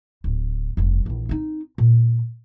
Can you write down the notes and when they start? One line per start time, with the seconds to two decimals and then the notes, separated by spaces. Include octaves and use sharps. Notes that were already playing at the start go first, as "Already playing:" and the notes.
0.24 D1
0.77 F1 G2
1.06 A#1 E3
1.29 C4 D#4
1.78 A#2